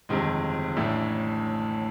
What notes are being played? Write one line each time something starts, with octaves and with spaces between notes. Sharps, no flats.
G1 F2 C3 D#3 G#3
A1 A2 E3 A3 D4